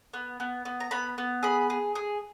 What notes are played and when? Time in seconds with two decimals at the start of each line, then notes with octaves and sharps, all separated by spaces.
0.13 B3
0.40 B3
0.65 B3
0.80 A#5
0.91 B3 B5
1.18 B3
1.43 G#4 B5
1.70 G#4
1.95 G#4